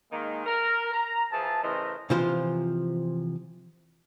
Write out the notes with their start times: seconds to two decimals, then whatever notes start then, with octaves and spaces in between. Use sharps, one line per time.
0.12 D#3 G#3 A#3
0.46 A#4
0.94 A#5
1.32 E3 F3 G#4 A5
1.63 C#3 E3 A3 A#4 C5 D#5
2.10 C3 E3 F3 F4 C5